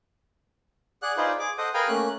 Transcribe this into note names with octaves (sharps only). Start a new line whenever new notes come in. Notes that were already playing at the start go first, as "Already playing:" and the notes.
G#4 D5 F#5 F#6
D#4 F4 G#4 B4 C5 D5
G#4 D6
A4 C5 D#5 F#5 D#6
G#4 A#4 B4 F5 G5 G#5
A3 A#3 C#4 F#6